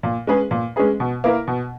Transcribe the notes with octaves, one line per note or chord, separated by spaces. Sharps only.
A#2
G#3 C#4 G#4 B4
A#2
G#3 C#4 G#4 B4
B2
A#3 E4 A#4
B2